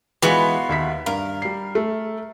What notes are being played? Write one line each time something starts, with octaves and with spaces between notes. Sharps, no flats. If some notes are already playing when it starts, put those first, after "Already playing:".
E3 G#3 B3 F4 F#4
D#2 E5 B6
G2 A#4 F5
G3 C7
A3